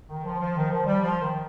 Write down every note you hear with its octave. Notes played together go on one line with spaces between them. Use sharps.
D#3
F3
F3
D#3
F3
G3
F3
D#3